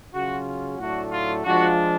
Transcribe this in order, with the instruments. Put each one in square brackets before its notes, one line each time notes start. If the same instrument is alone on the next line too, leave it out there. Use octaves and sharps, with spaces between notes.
[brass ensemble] C#3 F#3 C#4 F4 F#4
A2 F#3 A3 D4 F#4
F4
F3 G#3 D4 F4 F#4